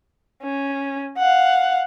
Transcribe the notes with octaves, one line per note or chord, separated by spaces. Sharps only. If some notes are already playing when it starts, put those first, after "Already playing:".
C#4
F5 F#5